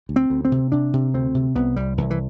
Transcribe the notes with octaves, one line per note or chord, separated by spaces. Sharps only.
D2
C4
D2
C4
C3
C3 D4
C3
D2 C4
C3
C2 B3
C2 G3
C2 E3
E3